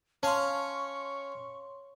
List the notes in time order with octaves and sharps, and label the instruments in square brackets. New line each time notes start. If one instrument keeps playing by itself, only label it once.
[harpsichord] C#4 F5 [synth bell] C#5 C6 [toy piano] A5 [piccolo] C#6